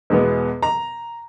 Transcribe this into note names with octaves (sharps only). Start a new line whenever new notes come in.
E2 B2 G#3 B3
A#5